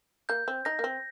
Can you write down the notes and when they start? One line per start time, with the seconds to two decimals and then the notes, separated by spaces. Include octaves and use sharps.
0.29 A#3 G6
0.48 C4
0.65 D#4 A#6
0.79 A#3
0.84 C4